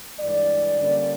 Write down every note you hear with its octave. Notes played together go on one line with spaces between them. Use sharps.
G2 E3 G#3 D5
D3 G3 A#3 C#4